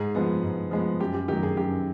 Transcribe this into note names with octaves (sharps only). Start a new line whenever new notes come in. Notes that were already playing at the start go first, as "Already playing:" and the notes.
Already playing: G#2 G#4
F3 G#3 B3
G#2
F3 G#3 B3
F#2 G4
G4
D#3 F#3 G4
G#4
F#2 G4